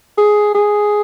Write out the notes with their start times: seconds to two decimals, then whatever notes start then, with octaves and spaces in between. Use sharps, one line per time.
0.18 G#4
0.55 G#4